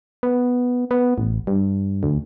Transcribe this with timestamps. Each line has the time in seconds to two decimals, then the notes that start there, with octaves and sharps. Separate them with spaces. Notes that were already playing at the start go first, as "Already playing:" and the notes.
0.23 B3
0.91 B3
1.18 A1
1.47 G2
2.03 D2